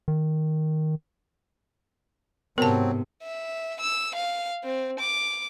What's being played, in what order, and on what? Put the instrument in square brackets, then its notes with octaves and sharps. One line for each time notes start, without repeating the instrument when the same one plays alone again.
[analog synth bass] D#3
[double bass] G#2 C3 [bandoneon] F#3 C4 [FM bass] B3 [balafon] A#4 A5
[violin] E5
E6
F5
C4
D6